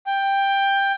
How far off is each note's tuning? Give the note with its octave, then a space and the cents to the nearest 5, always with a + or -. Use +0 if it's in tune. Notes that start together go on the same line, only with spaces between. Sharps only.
G5 +10